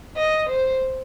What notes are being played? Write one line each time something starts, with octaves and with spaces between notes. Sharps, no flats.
D#5
C5